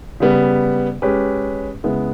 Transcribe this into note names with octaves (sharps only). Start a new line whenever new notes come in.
C#3 G3 B3
G#3 C#4 G4 B4
C#3 G#3 B3 E4